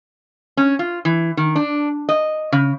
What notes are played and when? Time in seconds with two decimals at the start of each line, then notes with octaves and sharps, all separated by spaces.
0.57 C#4
0.79 F4
1.05 E3
1.37 D#3
1.56 D4
2.09 D#5
2.52 C#3